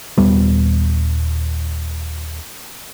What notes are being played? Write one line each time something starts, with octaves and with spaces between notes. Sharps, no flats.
D#1 G3 B3